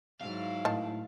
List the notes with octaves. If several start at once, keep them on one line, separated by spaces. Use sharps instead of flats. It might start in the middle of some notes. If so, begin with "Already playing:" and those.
G#2 F#3 E4 F5
A2 D#3 A5